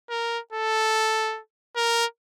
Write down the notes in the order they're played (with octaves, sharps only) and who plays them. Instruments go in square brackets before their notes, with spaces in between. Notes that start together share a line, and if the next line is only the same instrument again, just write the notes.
[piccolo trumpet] A#4
A4
A#4